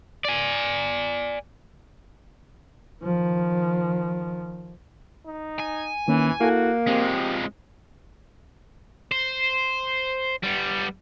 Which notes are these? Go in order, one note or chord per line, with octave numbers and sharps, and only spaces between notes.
D5 G#5
D#3 F3
D#4
G#5
D#3 E3 A#3 C#4
A#3 E4 F#4 A4
F3 G#3 C4 G4
C5
G3 B3